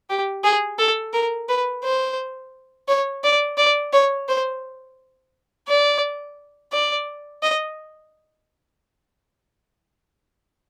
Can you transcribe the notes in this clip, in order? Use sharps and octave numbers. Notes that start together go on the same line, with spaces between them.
G4
G#4
A4
A#4
B4
C5
C#5
D5
D5
C#5
C5
D5
D5
D#5